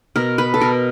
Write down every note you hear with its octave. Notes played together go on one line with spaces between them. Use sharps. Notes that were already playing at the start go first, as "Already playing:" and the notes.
B2 A#4
B4
A4
B2 A#4